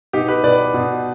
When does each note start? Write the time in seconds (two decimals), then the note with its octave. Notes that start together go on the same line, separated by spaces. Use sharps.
0.13 B2 D#4 G4
0.28 G4 B4
0.44 B2 B4 D5
0.74 B2